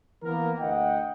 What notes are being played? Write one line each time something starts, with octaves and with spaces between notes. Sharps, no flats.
E3 A#3 B3 A#4
D2 D#5 F#5 G5